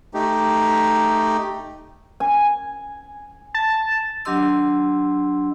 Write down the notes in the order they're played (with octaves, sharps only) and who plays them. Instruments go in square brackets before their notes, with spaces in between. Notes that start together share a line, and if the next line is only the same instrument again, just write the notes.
[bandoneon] A3 D#4 G4
[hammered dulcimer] G#5
[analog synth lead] A5
[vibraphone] F#3 D4 G4 D#5 C6 E6